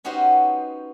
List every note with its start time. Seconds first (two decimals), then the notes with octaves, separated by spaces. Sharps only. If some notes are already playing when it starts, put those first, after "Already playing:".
0.04 B3 C#4 D#4 F#4 G4 C5